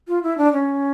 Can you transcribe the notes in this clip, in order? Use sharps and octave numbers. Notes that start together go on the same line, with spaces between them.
F4
E4
D4
C#4